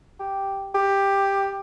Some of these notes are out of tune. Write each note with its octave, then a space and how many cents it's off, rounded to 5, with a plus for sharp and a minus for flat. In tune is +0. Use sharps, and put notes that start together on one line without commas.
G4 +0
G4 +10